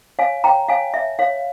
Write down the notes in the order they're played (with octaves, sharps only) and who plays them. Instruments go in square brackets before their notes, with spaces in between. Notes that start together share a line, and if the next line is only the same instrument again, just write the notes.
[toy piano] C#5 F5 G#5
C#5 G5 A#5
C#5 F5 G#5
C#5 E5
C#5 F5